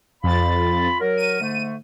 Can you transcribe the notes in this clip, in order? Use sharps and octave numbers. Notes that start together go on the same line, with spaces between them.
F2 F4 B5 A6
F#3 A#4
D#7
G#2 D3 A3